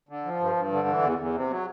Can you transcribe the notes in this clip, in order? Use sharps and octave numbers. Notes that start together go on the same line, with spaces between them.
D3
F3
G2
G2
D3
E3
E2
E2
C3
F#3